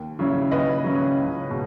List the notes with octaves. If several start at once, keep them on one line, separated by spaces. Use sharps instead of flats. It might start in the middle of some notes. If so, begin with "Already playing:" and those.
Already playing: D#2
C#3 F#3 C#4 E4
D#2 B4 D#5
C#3 F#3 C#4 E4
C#2
B2 G#3